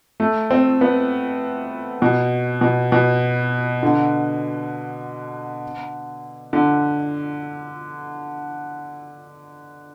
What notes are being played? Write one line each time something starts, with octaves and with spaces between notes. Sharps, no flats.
A3
C4
B3
B2
B2
B2
D3
D3